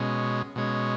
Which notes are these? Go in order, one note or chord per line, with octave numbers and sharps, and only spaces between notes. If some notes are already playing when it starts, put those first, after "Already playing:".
Already playing: B2 G#3 C#4
B2 G#3 C#4